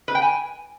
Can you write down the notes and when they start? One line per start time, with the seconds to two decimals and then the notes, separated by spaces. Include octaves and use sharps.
0.08 B4
0.15 G5
0.22 G#5